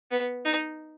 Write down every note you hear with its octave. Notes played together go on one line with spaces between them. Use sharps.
B3
D#4